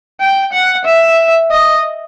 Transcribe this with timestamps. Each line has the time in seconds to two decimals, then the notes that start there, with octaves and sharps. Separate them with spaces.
0.21 G5
0.53 F#5
0.85 E5
1.51 D#5